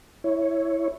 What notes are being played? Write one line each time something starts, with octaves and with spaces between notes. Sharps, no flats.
E4 C#5